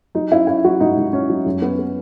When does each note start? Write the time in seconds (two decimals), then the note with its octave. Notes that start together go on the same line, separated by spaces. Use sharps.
0.15 F#3 D#4
0.32 C#4 E4
0.47 C#4 E4
0.64 F#3 F#4
0.80 G#2 D#4
0.97 G#2
1.13 C#4
1.29 F#3
1.46 F#2
1.62 B3
1.79 B3